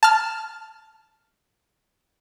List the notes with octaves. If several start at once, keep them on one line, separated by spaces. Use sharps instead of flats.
A5 F6